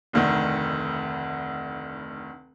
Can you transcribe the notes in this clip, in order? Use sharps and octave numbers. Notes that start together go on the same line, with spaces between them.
F1 D2 D#3